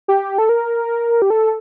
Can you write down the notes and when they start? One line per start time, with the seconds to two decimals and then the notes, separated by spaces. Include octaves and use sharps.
0.08 G4
0.38 A4
0.49 A#4
1.22 G4
1.30 A4